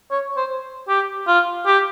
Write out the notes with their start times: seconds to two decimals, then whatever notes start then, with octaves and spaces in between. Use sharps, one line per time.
0.11 C#5
0.36 C5
0.88 G4
1.27 F4
1.66 G4